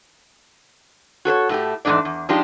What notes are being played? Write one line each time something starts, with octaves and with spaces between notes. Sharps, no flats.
F#4 A4 C5 C#5
A2 A3 G4
E2 G#2 D#3 A3 D4 D5
E2
F3 G#3 D4 D#4 G4